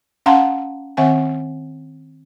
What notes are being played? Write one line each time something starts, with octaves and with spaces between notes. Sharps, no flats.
C#4 F5 F#5 A5 A#5 C6
D#3 C4 E5 F#5 G#5